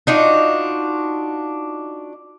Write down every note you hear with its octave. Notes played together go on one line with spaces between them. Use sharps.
D4 D#4 F4 F#4